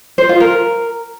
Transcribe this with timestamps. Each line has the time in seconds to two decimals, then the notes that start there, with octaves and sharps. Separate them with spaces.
0.18 C5
0.29 F4
0.40 A#4